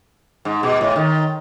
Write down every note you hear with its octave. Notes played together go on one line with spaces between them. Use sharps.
G#2
B2
A2
D#3